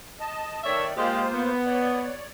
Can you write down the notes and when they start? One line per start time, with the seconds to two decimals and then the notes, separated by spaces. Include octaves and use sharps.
0.20 D#5 A5
0.64 D#3 A3 C#5 D5 E5
0.97 G#3 A#3 F4 G4 C5
1.33 B3
1.66 C#5 D5